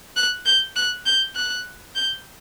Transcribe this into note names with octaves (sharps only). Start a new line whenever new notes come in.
F#6
G6
F#6
G6
F#6
G6